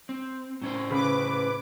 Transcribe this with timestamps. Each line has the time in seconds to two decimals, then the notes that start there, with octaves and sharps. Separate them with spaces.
0.09 C4
0.62 A2 C#4 C5
0.90 C#3 B4 D6